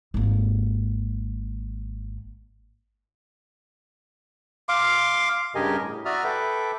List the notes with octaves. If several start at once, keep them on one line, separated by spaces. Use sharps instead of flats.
G#1 A#3
F5 C6 D6
G2 C#3 G4 A#4 D#5 G#5
A2
F#4 D5 E5 A#5 D#6 F6
A4 B4 E5 G5 D6